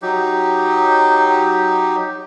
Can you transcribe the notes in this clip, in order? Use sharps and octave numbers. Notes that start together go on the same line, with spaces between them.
F#3 D#4 G4